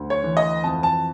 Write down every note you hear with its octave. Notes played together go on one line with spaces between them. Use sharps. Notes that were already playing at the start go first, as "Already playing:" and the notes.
Already playing: D2
C#5
E3
D#5
F2 A5
A5